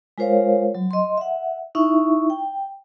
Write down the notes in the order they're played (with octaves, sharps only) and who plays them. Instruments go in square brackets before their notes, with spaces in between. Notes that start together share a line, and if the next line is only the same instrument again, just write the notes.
[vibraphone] G#3 F4 A#4 C5 C#5 F5
F#3
D#5 C6
E5 F#5
D#4 E4 E5 C#6
G5